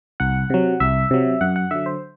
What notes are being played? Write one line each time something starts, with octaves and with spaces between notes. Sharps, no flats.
C2 F#5
C3 F#3
C2 E5
C3 F#3
F#2 F#5
F#5
D3 F#3 E5
C5